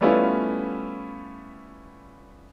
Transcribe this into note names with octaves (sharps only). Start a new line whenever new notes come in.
G3 A3 B3 C#4 E4 F4